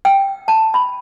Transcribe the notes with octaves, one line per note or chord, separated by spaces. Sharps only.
G5
A5
B5